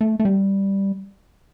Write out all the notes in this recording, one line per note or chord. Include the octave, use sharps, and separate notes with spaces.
A3
A3
G3